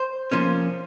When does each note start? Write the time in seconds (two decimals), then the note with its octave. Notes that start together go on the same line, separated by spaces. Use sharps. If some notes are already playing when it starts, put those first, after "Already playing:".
Already playing: C5
0.31 F3 A#3 C#4